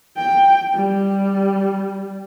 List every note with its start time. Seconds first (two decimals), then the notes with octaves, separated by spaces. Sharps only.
0.17 G5
0.75 G3